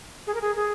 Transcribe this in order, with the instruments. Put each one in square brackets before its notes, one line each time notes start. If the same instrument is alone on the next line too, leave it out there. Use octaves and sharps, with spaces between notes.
[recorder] G#4
A#4
G#4
G#4